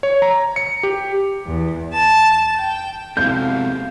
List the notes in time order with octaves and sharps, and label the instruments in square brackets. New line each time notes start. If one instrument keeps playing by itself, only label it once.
[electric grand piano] C#5
A#5
C#7
G4
[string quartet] E2
A5
G5
[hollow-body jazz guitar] C3 G#3 E4 [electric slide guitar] B3 F#4 A4 [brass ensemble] F5 [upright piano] G6